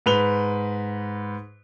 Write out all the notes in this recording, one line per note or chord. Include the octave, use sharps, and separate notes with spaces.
G#2 B4 F7 G7